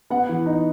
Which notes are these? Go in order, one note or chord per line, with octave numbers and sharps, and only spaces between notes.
B3 F#5
E3
D#4